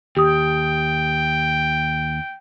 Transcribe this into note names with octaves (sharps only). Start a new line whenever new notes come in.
D#2 G4 G5 D#6